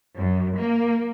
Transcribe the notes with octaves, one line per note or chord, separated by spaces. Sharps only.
F#2
A#3